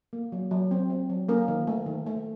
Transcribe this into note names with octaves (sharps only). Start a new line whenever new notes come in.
A#3
F#3
F#3
C4
C4
F#3
A#3 C#4 A#4
D#3
A3
D#3
A3